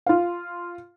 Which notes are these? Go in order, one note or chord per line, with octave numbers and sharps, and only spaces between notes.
F4 F5